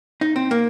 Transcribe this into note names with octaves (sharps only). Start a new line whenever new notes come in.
D#4
C4
A#3